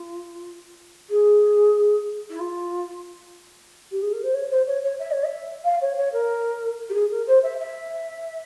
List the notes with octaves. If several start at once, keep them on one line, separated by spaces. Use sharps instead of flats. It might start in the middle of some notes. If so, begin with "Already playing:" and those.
Already playing: F4
G#4
E4
F4
G4
G#4
A#4
C5
C#5
C5
C#5
C#5
E5
C#5
E5
F5
C#5
C#5
A#4
G4
G#4
A#4
C5
E5
E5